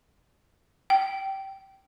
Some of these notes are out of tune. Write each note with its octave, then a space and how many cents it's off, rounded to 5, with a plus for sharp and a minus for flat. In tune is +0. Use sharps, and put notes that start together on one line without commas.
G5 -15